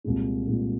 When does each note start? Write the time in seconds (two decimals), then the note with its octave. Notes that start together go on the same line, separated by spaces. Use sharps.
0.04 C2 A#2 G#3
0.47 C2 A#2 G#3